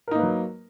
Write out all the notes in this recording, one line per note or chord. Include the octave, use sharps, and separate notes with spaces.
F#3 A#3 D#4 A#4 B4